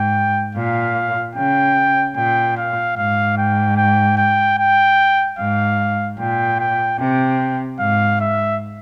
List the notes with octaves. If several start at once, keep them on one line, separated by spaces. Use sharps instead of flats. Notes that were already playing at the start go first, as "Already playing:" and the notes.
Already playing: G#2 G5
A#2 F5
C#3 G5
A#2 G5
F5
G#2 F5
G5
G5
G5
G5
G#2 F5
A#2 G5
G5
C3 G5
G#2 F5
E5